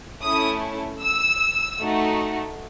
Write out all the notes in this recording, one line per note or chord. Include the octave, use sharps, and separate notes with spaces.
A3 C#4 E4 D#6
E6
A3 D#4 F#4